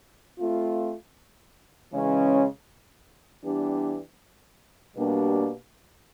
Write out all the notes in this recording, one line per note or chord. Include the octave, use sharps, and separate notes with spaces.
A3 C4 F4
C#3 E3 G#3 C#4
E3 G3 B3 D4 G4
B2 G3 A#3 D4 G4